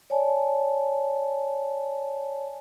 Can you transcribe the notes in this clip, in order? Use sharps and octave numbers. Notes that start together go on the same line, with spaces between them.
C#5 D5 G#5 A5